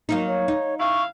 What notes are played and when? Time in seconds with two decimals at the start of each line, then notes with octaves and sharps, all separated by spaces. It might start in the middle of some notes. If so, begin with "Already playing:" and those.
0.09 F#3 A#3 D#4
0.27 C#5
0.48 D#4
0.80 C#3 E4 F5 C#6